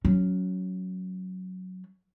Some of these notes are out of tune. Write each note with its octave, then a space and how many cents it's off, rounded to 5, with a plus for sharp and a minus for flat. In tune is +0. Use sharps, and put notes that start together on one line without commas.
F#3 +0 C#4 +5